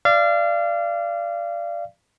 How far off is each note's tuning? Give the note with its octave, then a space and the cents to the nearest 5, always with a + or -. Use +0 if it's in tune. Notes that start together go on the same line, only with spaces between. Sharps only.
D5 +0 F5 -30